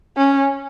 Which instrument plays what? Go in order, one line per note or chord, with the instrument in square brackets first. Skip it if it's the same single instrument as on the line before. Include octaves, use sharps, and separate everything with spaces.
[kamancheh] C#4